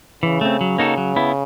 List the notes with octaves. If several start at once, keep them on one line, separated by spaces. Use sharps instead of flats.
C#3 E3
A3 C4
F#3
A#3 D#4 F#4 A4
F#3
B3 E4